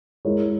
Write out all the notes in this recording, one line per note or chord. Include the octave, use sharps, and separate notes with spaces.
G#3 E4 A#4 C#5